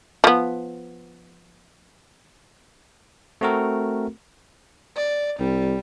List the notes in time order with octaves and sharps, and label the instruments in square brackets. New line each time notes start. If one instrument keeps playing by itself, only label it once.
[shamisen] F3 B3
[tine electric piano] A3 C4 F#4 A4 A#4
[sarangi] D5
[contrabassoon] C2 [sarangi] G3